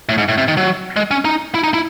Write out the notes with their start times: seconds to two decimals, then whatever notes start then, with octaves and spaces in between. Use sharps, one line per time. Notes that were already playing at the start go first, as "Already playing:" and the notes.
0.09 A2
0.18 G#2
0.29 A2
0.38 C3
0.48 D#3
0.57 F#3
0.96 G#3
1.11 C#4
1.25 D#4
1.55 E4
1.64 D#4
1.74 E4